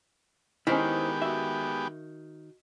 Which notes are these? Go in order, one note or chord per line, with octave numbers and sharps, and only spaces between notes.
D#3 G#3 B3 C#4 E4 G4 C5 A#5
F#4 E5